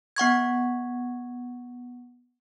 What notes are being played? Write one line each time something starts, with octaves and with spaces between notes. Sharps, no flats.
B3 F#5 C#6 G#6